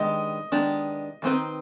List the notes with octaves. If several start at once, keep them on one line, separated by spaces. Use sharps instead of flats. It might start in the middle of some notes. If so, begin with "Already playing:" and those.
Already playing: D#3 G#3 B3 D4 G4 D#5
D#3 G#3 B3 D4 G4
D#3 G#3 C4 D#4 B4